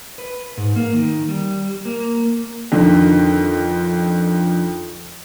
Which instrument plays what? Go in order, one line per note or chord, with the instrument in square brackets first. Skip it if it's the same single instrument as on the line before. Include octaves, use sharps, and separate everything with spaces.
[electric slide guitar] B4
G#2
A#3
D#3
G3
A#3
[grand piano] F2 D3 D#3